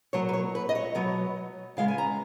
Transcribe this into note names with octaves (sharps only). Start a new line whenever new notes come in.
B2 F#3 A#3 C#5
B4
C#5
B4
D#5
C#5
B2 F#3 B3
C#3 G#3 B3 F5
G#5
A#5